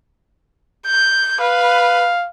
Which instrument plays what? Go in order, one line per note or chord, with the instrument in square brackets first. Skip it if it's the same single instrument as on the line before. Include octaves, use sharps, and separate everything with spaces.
[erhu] G6
[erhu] B4 [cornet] F5